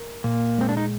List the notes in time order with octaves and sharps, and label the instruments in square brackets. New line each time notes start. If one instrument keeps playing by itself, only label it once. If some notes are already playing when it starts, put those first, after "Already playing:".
Already playing: [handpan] A#4
[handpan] A#2 [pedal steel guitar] A#3
[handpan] G#3 [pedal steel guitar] C4
[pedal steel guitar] D4
D#4